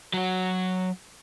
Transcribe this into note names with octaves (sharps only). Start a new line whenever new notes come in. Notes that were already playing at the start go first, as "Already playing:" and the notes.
F#3 F#4